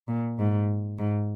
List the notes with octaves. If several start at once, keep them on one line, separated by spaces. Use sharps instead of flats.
A#2
G#2
G#2